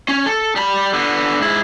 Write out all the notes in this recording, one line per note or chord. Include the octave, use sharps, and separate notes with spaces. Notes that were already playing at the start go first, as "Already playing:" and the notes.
C#4
A4
G3 B5
D3 B3
G#2 E4